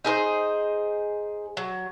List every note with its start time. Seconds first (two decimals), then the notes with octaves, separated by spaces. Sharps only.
0.04 D#4 G#4 A#4 C5
1.57 F#3